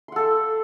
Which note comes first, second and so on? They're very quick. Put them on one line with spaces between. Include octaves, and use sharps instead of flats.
C6 F#5 A4